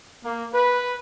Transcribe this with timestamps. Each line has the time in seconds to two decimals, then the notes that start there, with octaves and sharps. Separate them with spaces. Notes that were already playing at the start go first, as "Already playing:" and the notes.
0.24 A#3
0.53 B4